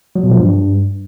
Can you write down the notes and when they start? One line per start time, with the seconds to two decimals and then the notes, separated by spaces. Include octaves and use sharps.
0.16 F#3
0.23 B2
0.31 F3
0.39 G2